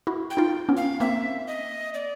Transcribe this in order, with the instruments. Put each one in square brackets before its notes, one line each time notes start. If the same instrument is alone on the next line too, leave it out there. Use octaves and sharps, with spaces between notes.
[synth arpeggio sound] E4 F#4
[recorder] G5
[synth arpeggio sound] D#4 F4
B3 C#4
[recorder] F5
[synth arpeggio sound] A#3 C4 [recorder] E5
[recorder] D#5
D5